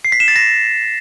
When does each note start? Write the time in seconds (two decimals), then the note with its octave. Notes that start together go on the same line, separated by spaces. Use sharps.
0.05 C7
0.12 B6
0.20 E7
0.28 A6
0.36 A#6